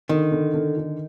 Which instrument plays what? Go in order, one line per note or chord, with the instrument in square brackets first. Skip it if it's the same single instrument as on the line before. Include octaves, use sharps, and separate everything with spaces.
[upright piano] D3 [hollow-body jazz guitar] D#3
[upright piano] D3
D3
D3